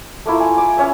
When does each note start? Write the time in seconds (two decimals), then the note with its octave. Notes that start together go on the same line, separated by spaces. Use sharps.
0.26 A3 A#3 E4 F4
0.40 G#5
0.58 D6
0.77 C#4 C#5 E5